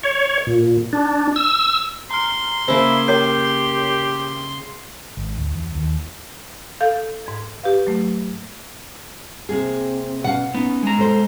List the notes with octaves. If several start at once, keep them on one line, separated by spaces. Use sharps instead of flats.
C#5
A#2
D4
E6
A#5 C6 F6
C#3 A#3 E4 C5
G4 A#4 C#5 G6
G#1
D2
E2
D#2
A4 F5 G6
G#2 G#6
G4 B4 F5
F#3 A3
C3 A#3 C4 G#4
B2 C#4 F5 F#5
B3 C#4 D#4
G#3 A#5
B2 A4 C5